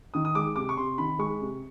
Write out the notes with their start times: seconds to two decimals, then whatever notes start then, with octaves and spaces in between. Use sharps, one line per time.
0.14 D#3 D#6
0.25 D#6
0.35 G#3 D6
0.56 C3 D6
0.69 C#6
0.77 C3 C6
0.98 D#3 B5
1.19 G#3 C#6
1.41 C3